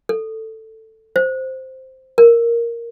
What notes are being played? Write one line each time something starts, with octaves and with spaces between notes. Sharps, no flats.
A4
C5
A#4